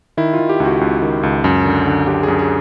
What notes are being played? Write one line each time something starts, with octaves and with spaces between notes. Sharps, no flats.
D#3 E4
F4
D#3
G4
C#2
F#4
C#2
D#3
C#2
F#2
D3
D3
F#2 G4
F#2 G#4
G#4